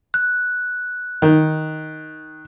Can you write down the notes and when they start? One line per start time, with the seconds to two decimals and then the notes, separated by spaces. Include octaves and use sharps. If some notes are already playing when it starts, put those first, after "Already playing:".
0.14 F#6
1.22 D#3